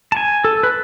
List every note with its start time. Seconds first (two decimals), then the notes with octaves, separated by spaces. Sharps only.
0.12 A5
0.17 G#5
0.44 A4
0.63 B4